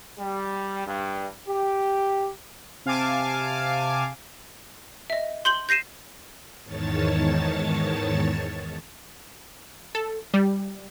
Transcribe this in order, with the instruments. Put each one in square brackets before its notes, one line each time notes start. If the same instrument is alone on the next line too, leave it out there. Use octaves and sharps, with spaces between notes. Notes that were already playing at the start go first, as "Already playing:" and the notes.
[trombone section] G3
G2
G4
[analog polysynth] C3 F5 G#5 A5 D6
[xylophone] D#5 E5
C6 G6 F#7 G7
G6 A#6 C7 D#7 E7
[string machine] E2 G#2 D#3 C#5 A5 A6
[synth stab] A4
G3